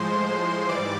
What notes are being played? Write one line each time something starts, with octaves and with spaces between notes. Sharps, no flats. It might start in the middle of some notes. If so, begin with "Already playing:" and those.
Already playing: A2 F3 G#3 C5 C6
G#2 E3 G3 D5 D6